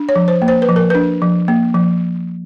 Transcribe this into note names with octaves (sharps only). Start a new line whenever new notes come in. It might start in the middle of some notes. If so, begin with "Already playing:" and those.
Already playing: D4
C#5
F3
C5
A#3
C5
B4
F3
A#4
D4 B4
F3
A#3
F3